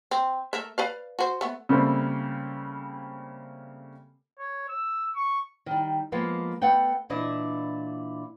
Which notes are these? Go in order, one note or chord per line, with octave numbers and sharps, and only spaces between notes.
C4
A3 A#4 E5
B4 D5 F5
F#4 C5
A3 B3
C#3 G3 A3 A#3 C4
C#5
E6
C#6
D#3 G3
F3 G#3 A#3 B3
A3 B3 F#5 G5
A#2 E3 D4 E4 D#5